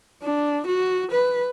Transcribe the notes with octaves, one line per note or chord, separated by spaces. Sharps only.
D4
F#4
B4